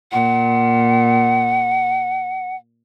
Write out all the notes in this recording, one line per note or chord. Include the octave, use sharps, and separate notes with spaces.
A#2 F#5